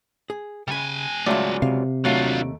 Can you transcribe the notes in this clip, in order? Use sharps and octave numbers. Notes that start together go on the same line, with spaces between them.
G#4
C#3 G3 G#5 B5
C#2 F#3 A3 F4 D5
C3 F5
D#2 F#3 A3 D4 F4 F5